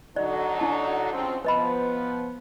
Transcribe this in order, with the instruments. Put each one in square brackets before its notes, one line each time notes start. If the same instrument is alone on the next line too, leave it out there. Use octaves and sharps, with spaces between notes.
[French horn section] D3 F#3 D#4 [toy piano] D5
[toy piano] D4 E4 A5
[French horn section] C#3 F3 C4
[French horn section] F3 B3 [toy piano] B4 D#5 B5